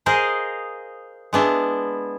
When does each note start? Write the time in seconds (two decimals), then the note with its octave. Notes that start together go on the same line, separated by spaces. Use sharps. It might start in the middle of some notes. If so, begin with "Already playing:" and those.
0.06 G#4 A#4 C5 D#5 F5
1.33 G#3 B3 D4 E4